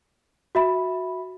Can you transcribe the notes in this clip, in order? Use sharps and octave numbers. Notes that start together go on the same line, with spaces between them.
F#4 E5 B5